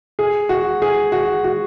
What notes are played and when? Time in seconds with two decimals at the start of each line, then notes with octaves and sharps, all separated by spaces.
0.19 G#4
0.49 F#4
0.82 G#4
1.12 F#4
1.44 F#4